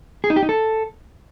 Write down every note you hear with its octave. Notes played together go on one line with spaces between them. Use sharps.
G#4
D#4
G4
D#4
A4